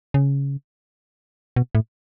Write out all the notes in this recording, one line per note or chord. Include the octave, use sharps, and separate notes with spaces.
C#3
B2
A2